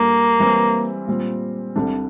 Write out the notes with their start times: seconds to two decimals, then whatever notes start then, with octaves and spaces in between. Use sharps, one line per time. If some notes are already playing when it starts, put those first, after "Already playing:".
Already playing: A#2 G3 A#3 D4 A4
0.40 E3 G3 C4
1.07 A#2 G3 C4 F4
1.76 C2 C3 G3 D4 A4